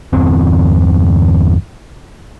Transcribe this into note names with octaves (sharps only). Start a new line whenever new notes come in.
G1 E2 C4